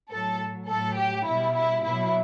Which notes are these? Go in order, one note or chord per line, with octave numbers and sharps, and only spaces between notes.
A2 F#3 A4
A2 F#3 A4
G4
B2 G3 E4
E4
B2 F#3 E4